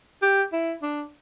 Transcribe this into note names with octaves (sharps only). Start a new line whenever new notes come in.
G4
E4
D4